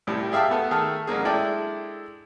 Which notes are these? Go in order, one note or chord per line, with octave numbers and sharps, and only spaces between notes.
C2 A2 G3
G4 G#4 E5 F5 G5 A5
A3 B3 A4
D#3 A3 G#4 A4 F6
A1 F#3 A#3 G#4
G#3 D4 E4 A4 D5 G5